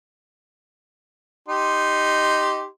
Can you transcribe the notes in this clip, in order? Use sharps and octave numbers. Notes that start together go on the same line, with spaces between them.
D#4 G4 C6